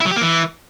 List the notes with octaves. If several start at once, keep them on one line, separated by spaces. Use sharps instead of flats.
E4
F#3
G4
A#3
E3